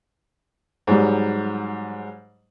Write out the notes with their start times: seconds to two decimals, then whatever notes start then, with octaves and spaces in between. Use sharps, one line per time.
0.87 G#2 F#3 G3